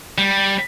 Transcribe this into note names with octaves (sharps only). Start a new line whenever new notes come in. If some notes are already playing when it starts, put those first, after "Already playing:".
G3